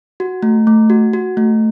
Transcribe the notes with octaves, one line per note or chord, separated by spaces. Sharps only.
F#4
A3
A3
F#4
F#4
A3